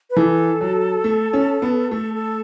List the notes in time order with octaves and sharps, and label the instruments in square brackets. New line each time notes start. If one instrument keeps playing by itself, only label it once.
[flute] B4
[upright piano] E3 [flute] A4
[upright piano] F#3
A3
C#4
B3
[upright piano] A3 [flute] A4
[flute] A4